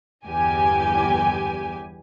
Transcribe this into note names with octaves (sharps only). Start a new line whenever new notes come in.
G1 E2 G4 G#5